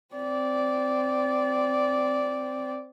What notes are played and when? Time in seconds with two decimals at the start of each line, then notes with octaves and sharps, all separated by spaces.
0.15 C4 D5